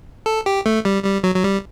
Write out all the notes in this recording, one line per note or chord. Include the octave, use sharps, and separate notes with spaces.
A4
G4
A3
G3
G3
F#3
F#3
G3